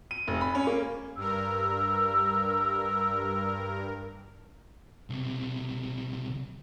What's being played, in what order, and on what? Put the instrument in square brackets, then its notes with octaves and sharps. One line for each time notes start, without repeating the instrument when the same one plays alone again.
[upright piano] D#7
F1
B5
C#4
A#3
[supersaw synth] G2 A#4 [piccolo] E6
[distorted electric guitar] B1 C3